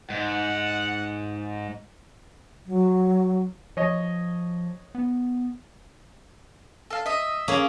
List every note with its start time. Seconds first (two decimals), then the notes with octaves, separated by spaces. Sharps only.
0.10 G#2 F#5
2.66 F#3
3.77 F3 C#5 D#5
4.95 B3
6.91 A4 F5
7.06 D#5 E5
7.48 A#3 C#4 G#4